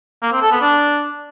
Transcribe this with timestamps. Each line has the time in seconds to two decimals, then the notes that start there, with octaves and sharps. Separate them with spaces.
0.23 A#3
0.32 C4
0.42 A4
0.52 B3
0.61 D4